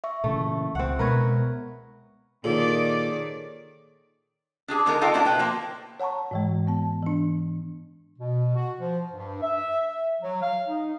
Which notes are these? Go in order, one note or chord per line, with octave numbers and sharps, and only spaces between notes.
E5 C#6
A#2 C#3 E3 A3
C#2 C4 F#5
B2 G#3 B3 A#4 B4 C#5
A#2 D#3 G#4 A4 C#5 D5
D4 G4 G#4
D3 G#3 B3 D#4 G#4 A#4
D#4 F4 A4 D#5 F5 G5
A3 B3 D4 E4 F#4 G4
B2 B4 G5
F3 A#3 C5
C#5 F#5 A5 A#5 C#6
G#2 E3 G#3
B3 A5
E3 D4
B2
F#4
F3
G2
E5
F#3
F5
D#4